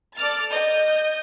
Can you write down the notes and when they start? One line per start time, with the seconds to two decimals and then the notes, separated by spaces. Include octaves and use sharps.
0.16 A4 D5 F6 A6
0.52 D#5 G6